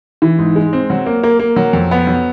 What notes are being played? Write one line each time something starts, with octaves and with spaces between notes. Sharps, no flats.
E3
G#2
G#3
C4
F#3
A#3
A#3
A#3
F#3
F2
B3
F#3